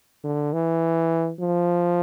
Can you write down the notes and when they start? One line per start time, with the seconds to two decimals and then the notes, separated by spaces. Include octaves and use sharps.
0.24 D3
0.53 E3
1.40 F3